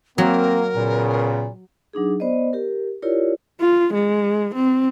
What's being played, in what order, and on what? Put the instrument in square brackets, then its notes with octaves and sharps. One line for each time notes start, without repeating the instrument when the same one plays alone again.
[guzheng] F#3 [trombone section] A#3 [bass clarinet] C4 [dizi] A#4
[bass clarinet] A#2 [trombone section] C#3 B3
[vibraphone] F#3 D4 D#4 G#4
B3 C5 D5 D#5
G4 A#4
E4 F4 G4 A#4 C#5 D5
[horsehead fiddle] F4
G#3
C4